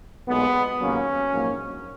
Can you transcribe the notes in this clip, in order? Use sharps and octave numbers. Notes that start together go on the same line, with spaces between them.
B1 A#2 G#3 B3
D#2 C#3 F#3 A#3 C#4
A#1 G#2 F#3 A#3